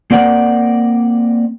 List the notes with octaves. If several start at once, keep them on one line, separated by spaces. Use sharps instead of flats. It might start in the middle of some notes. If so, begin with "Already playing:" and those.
A#3 C4 A#4 D5 F#5